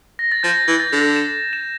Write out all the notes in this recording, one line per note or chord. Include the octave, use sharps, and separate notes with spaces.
A#6
A6
F3 G6
E3
A6
D3
E7
E7